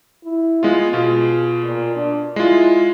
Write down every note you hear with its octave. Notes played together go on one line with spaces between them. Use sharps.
E4
G#3 B3 F4
B2 F4 G#4
A#2
D4
G#3 E4 F4